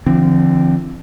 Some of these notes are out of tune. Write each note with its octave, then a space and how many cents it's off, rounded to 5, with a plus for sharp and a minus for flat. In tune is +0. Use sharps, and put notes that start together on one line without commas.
D3 +0 F3 -40 C4 +0